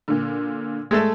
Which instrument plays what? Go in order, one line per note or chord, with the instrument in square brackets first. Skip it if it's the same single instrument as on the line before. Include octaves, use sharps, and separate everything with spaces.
[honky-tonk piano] A#2 D3
[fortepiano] G#3 A3 A4